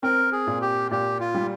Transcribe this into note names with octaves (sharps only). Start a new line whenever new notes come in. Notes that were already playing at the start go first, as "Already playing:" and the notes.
C4 A#4
G#4
A#2
G4
A#2 G4
F4
G3